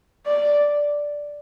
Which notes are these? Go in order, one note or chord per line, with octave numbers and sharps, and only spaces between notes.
D5